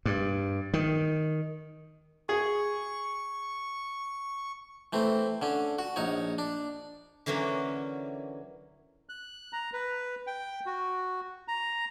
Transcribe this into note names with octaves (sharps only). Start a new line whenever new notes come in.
G2
D#3
G#4 C#6
E3 A3 C4
D3 C#4
F#4
A#1 D#4 C#5
D4
D3 E3 F#3 A#3 C#4
F#6
A#5
B4
G5
F#4
A#5